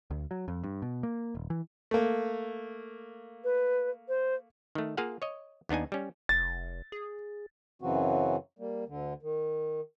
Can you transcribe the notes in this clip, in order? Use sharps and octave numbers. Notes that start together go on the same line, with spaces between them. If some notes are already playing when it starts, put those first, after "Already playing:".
D2
F#3
F2
G2
B2
A#3
D#1
E3
A3 A#3
B4
C5
D#3 A3
A#3 F4 G#4 F5 F#5
C#5 D#5
D#2 B3 D4 D#4 G#5
G3 C#4
F1 A6
G#4
F#2 C#3 E3 F#3 C4 F#4
G3 A#3
D2 D3
D#3